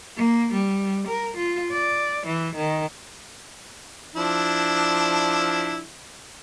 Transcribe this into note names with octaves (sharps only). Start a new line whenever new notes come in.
A#3
G3
A#4
F4
D5
E3
D#3
F3 D4 E4